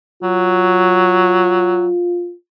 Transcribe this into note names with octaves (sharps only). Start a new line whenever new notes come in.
F#3 F4